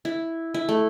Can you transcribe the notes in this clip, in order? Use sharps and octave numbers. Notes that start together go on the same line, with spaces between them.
E4
E4
A3